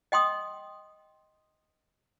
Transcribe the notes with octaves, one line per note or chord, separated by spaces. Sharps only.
D#5 G5 C6 D#6